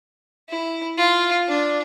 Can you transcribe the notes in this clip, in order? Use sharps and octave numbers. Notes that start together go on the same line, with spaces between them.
E4
F4
D4